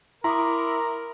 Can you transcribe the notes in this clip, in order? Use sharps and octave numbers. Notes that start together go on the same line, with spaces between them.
E4 A#4 A#5 C6 D6 D#6